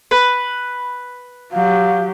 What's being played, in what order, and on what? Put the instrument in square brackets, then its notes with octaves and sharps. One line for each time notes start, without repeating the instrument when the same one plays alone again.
[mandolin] B4
[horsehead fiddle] F#3 G4 [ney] F5